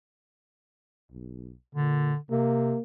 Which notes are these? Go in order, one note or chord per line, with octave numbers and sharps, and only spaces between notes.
B1
A#2 D3
C3 A#3